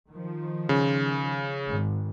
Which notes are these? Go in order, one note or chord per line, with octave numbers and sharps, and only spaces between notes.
D#3 F3
C#3
G#1